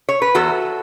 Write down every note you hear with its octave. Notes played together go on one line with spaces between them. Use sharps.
C#5
B4
E2 F#4 A4